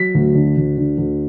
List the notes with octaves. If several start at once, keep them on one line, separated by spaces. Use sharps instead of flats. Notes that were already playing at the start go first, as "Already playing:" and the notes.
Already playing: F#3 B6
D2
D3
D2
D3
D2